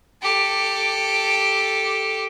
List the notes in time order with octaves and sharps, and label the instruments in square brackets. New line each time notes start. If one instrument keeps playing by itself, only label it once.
[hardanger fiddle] G4 A4